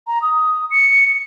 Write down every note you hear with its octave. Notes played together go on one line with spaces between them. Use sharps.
A#5
D#6
C#7